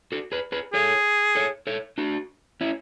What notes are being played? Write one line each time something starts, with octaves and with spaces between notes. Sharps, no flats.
F#4 A4
G#4 B4
G#4 B4
G#4 A4 C#5
A4 C#5
A4 C#5
D4 F#4
C#4 E4